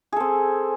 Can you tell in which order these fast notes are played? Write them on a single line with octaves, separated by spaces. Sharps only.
G#4 A4 C4